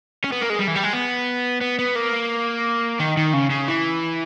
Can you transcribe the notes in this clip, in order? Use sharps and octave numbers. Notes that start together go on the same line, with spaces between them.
C#4
B3
A#3
G#3
G3
E3
G3
G#3
B3
B3
B3
A#3
D#3
D#3
C#3
C#3
E3